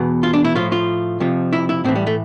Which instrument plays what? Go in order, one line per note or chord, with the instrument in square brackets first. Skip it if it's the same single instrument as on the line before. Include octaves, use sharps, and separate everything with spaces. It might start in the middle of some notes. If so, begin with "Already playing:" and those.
Already playing: [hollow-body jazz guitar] E2 B2
F4
D4
E4
A2 F3 F4
F4
F2 C3 F3
E4
E4
A2 C4
E3
G3
A3